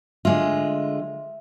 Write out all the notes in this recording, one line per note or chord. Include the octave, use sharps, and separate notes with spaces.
D3 G#3 F4 E5